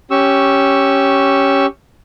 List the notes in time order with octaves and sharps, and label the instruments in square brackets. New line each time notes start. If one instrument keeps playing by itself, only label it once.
[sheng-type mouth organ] C#4 G4 C#6 E6